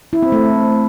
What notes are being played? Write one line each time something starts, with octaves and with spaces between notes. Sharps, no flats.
E4
C4
A3